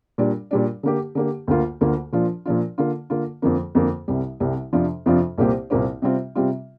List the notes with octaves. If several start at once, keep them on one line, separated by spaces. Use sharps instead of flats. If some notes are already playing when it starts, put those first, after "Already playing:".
A#2 G3 D4
A#2 G3 D4
D3 A#3 G4
D3 A#3 G4
D2 D3 A#3 F4
D2 D3 A#3 F4
A#2 F3 D4 F4
A#2 F3 D4 F4
D3 A#3 F4
D3 A#3 F4
F2 D3 F3 A#3
F2 D3 F3 A#3
C2 C3 G3
C2 C3 G3
F2 C3 F3 D4 F4
F2 C3 F3 D4 F4
C2 A#2 A#3 G4 C5
C2 A#2 A#3 G4 C5
C3 G3 C4 F4
C3 G3 C4 F4